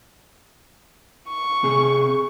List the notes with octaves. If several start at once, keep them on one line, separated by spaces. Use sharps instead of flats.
C#6
C3 G#4